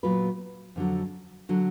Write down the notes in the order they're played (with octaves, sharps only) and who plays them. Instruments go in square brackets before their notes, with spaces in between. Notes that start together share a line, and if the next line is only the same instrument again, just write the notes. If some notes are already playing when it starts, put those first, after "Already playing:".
[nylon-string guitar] A#2 F#3 B3 F4 B4
F2 D3 F#3
D3 F#3